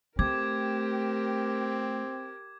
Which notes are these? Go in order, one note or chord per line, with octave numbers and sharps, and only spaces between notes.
A3 C4 G4 A#4 D6 G#6